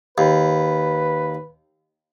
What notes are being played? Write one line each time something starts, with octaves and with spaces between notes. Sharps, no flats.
D#2 B4